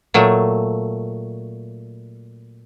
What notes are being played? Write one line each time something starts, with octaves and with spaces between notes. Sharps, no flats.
A#2 F#3 A3